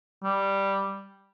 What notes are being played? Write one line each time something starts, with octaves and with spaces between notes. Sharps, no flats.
G3